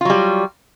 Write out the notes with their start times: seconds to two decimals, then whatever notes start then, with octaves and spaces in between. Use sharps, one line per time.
0.01 F4
0.05 F#3
0.10 G3